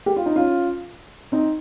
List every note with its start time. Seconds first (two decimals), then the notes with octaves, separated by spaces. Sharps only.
0.06 G4
0.16 F4
0.26 D#4
0.36 C#4 F4
1.32 C4 D#4